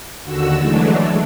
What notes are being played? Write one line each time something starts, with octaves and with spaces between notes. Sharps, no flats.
D#2 D3 F#4 E6
E3 F#3 G#3 A3 D4